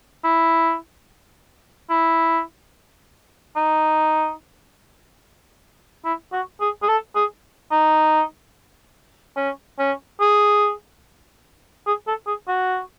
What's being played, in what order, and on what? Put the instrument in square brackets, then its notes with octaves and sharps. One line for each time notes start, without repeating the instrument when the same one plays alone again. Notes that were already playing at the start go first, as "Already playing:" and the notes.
[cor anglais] E4
E4
D#4
E4
F#4
G#4
G#4
A4
G#4
D#4
C#4
C#4
G#4
G#4
A4
G#4
F#4